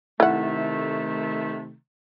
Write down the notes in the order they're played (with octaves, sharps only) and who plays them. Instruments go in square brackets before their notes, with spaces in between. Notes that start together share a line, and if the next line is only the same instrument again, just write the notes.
[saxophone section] C3 D#3 A3 [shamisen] E4 F#5